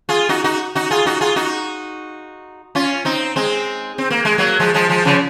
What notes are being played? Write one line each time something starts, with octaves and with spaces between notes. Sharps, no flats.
F4 G#4
D#4 F#4
D#4 F#4
D#4 F#4
F4 G#4
D#4 F#4
F4 G#4
D#4 F#4
C#4 F4
C4 D#4
G#3 C4
C4
A#3
G#3
F#3 A#3
F3 G#3
F3 G#3
F3 G#3
C#3 F3